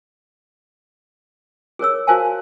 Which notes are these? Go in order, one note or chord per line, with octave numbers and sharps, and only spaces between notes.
G#4 A#4 C#5 E6
F#4 A#4 C5 F5 G#5 A5